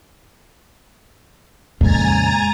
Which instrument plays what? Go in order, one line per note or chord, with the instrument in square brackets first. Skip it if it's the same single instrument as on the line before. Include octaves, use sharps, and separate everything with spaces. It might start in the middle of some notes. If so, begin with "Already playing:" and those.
[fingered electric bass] F2 A#2 C#3 [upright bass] G#3 A#3 [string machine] G#5 A#5 A6